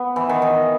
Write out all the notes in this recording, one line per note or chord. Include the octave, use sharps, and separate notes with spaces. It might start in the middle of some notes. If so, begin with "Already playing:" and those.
Already playing: B3
E3
D#3
D#3